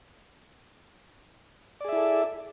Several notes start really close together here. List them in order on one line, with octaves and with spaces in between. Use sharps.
D5 G#4 E5 E4 A4